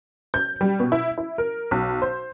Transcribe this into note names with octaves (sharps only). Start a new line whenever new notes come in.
G6
G3
B2
E4
E4
A#4
B1
C5